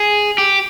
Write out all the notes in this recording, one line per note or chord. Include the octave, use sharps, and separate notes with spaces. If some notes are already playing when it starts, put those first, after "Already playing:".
Already playing: G#4
G4